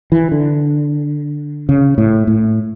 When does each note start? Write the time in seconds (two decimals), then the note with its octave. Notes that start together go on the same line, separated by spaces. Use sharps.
0.12 E3
0.32 D3
1.69 C#3
1.98 A2
2.27 A2